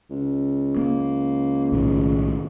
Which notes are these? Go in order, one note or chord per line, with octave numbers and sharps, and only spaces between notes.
C#2
A#3
B1 A2 D#3